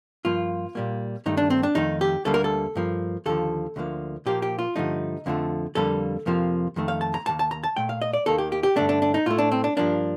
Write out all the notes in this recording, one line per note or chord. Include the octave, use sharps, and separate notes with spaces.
G2 F3 A#3 F4
A#2 G3 A#3
G2 D#3 A3 D#4
D4
C4
D4
F2 D#3 A3 D#4
G4
D2 D3 G3 A#3 A4
A#4
A4
G2 F3 A#3
D#2 D3 F3 A4
D2 D3 F3 A#3
A#2 F3 A#3 G4
G4
F4
G2 D3 F3 A3 D#4
F2 D3 F3 A3
F2 D3 G3 A#3 A4
F2 C3 F3 A#3
F2 D#3 A3
F5
A5
A#5
D#2 D#3 A#3 A5
A5
A#5
A5
A#2 A3 G5
F5
D#5
D5
D#2 D#3 A#3 A4
G4
G4
G4
G2 D3 A3 D4
D4
D4
D#4
A2 A3 F4
D4
C4
D4
G2 F3 A#3 D4